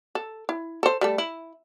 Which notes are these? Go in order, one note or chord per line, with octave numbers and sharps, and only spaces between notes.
A4
E4
A4 C5
G3 A3 A4
E4